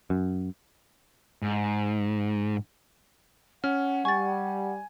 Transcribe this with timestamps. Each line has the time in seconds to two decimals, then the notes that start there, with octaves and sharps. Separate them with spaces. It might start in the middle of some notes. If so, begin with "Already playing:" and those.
0.10 F#2
1.42 G#2
3.64 C#4 F#5 F6
4.05 G3 G#5 C#6 A6